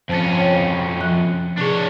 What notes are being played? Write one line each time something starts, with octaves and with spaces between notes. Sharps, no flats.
F2 C#4 C5 A5 A6
C#5 G5
F3 F#6
C3 D4 G#4 C#5